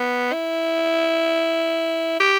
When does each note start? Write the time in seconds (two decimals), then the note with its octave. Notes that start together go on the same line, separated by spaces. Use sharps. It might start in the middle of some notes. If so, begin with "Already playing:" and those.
Already playing: B3
0.33 E4
2.20 G4